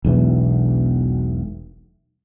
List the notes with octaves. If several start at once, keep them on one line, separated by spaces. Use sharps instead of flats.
E1 B1 E2 E3